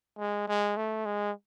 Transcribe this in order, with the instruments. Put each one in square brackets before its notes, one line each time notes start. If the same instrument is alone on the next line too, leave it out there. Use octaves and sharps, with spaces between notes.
[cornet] G#3
G#3
A3
G#3